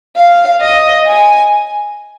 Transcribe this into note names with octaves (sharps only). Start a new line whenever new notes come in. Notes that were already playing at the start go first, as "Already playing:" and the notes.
F5
D#5
G#5